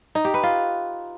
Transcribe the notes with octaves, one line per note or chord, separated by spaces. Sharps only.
D#4
G4
B4
F4